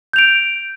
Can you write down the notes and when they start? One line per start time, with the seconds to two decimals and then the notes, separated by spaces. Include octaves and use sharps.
0.13 G6
0.16 F7
0.18 D7